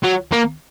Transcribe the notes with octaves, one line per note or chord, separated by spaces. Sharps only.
F#3
A#3